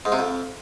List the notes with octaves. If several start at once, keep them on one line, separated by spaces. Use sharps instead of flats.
G#2
C3
F2